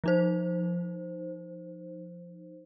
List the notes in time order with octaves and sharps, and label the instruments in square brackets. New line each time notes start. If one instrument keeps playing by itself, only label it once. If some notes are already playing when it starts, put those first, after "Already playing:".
[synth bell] F3 D#4 C5